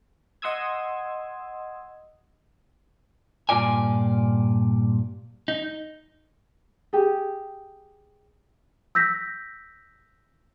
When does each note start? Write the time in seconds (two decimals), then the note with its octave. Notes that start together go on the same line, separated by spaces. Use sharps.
0.42 D#5 F#5 C6 D#6 E6 G#6
3.49 G2 A#2 F4 D5 G#5
5.48 D#4
6.93 G4 G#4
8.95 E6 G6 A#6 B6